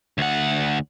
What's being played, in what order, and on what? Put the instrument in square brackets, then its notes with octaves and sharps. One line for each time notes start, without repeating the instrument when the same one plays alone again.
[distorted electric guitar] D2 F#5